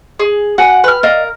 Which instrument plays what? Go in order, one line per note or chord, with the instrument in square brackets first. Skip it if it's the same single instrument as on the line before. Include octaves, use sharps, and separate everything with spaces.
[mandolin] G#4
[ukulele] F#4 G#5 [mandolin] F#5
[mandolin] B4 F6
[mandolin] A#4 [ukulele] D5 D#5 F5